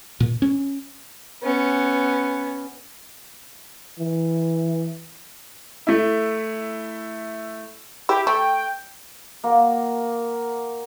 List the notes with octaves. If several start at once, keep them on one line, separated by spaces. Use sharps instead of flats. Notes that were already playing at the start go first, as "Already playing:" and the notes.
A#2
C#4
B3 C#4
E3
A3 E4
E4 G4
A3 G5
A#3 F#4